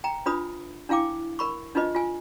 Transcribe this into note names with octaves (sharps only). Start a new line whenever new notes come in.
G5 A#5
D4 F4 B4 B5 D#6
D4 E4 F5 G5 D6
A#4 B5 C#6
D4 D#4 F4 B4 D#5
F4 G#5